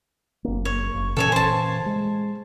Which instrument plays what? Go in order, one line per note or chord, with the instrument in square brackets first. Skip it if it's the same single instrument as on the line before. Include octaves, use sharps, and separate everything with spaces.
[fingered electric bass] F#1 A#3
[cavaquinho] C#5
[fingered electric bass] F#1
[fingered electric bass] A#2 C#3 E3 [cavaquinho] A4 C#5 G#5
[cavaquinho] C5 A5
[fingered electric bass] G#3